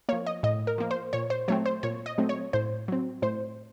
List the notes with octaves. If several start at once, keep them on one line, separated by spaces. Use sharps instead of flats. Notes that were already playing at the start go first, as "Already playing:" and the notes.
F3 A#3 C#5
D#5
A2 D#5
A#4
F3 A#3
C5
A#2 C#5
C5
F#3 A3 C4 C#5
C5
A#2 C#5
D#5
F#3 A3 C4
C#5
A2 C5
F#3 C4
A2 C5